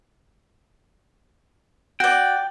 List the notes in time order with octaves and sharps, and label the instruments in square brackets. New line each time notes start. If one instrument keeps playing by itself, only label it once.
[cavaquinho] F#4 D5 [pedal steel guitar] G5